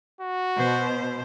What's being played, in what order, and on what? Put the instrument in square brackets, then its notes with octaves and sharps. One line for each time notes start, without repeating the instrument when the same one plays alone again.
[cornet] F#4
[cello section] B2 C5